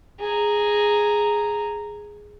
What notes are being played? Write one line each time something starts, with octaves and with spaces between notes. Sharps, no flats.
G#4 A#5